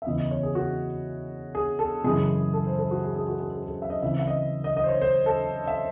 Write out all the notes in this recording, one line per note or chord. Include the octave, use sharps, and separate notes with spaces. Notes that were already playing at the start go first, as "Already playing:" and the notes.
E5
E2 C#3 E3 D#5
D#5
C#5
G#4
F#4
G#4
A4
F#2 C#3 E3 G#3 G#4
A4
C5
A4
F#4
G#4
G#4
F#4
G#4
G#4
G#4
E5
D#5
C#3 E3 C4 E5
E5
D#5
D#5
D#5
C5
C#5
C5
A4
E5